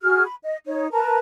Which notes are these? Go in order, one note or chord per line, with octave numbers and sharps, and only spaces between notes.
F#4 G#4 F6
B5
D#5
D#4 C#5
A#4 B4 A5 A#5